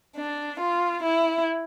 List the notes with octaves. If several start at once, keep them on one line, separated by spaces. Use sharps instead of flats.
D4
F4
E4